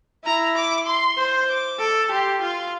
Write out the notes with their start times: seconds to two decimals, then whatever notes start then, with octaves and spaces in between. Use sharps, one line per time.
0.25 E4 A#5
0.56 D6
0.86 C6
1.18 C5
1.49 D6
1.79 A4
2.11 G4 C6
2.42 F4 C6